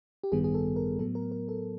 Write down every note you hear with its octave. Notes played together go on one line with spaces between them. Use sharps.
G4
A1 G2 D#3 G3 B3 G#4
G#4
A4
A#4
A2 F#3 B3 A4
A#4
A#4
A4